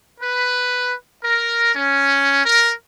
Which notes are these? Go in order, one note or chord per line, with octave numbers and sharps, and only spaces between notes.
B4
A#4
C#4
A#4